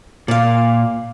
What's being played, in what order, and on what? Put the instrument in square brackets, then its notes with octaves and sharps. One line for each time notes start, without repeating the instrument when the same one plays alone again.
[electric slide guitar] A#2 [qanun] D5 F5